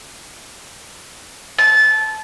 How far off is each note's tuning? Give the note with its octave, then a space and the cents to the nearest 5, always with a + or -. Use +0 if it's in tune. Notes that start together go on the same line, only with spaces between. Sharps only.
A5 -20